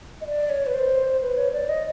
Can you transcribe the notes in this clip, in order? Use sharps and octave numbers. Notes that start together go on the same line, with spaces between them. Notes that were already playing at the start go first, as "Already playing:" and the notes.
D#5
D5
C#5
B4
C5
B4
C#5
D5
D#5